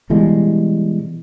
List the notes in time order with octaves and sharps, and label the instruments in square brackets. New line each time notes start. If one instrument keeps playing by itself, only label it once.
[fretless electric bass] B2 E3 G3 G#3